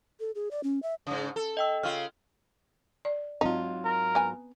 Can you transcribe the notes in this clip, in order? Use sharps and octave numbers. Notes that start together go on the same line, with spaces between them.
A4
G#4
D5
C#4
E5
G#2 C#3
A4
D#5 G5 E6
C#3 F4 F6
D5
G#2 F#3 C4 D#4 F4
A#4
B3 G#5 A#5